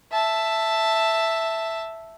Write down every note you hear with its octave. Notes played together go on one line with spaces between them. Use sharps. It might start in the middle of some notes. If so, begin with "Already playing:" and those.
E5 A5